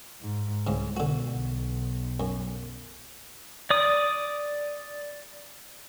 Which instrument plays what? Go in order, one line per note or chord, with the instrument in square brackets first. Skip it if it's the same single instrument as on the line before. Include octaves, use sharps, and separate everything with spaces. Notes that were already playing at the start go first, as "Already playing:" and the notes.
[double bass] G#2
[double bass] C2 [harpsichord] G#2 C#3
[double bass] B2 [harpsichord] D3 F#4
[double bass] B1
[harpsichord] F#2
[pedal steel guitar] D5 D#6